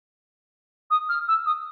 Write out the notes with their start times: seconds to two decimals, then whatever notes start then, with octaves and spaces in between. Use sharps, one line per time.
0.91 D#6
1.09 F6
1.28 E6
1.46 D#6